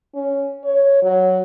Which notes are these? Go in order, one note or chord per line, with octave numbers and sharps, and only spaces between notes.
C#4
C#5
F#3